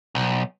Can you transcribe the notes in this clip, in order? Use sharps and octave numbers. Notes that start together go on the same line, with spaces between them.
B1